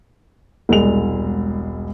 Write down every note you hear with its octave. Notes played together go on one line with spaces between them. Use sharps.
E1 C2 G#3 F7